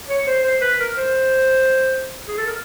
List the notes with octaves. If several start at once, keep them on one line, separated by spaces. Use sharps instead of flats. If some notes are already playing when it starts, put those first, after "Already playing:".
C#5
C5
C5
B4
A#4
C5
G#4
A4
A#4